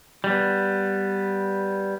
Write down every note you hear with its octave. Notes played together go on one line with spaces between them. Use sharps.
G3 B3